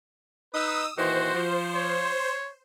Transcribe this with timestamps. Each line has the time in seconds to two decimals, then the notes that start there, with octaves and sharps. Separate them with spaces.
0.54 D#4 B4 D#6 E6
0.98 A#2 D#3 E3 F#4 C5
1.34 F3
1.74 C#5